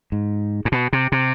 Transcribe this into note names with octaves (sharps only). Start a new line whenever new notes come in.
G#2
G#2
B2
C3
C3